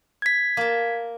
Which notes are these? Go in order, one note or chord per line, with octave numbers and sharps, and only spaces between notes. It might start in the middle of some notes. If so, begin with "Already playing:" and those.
G#6 B6
A#3 A5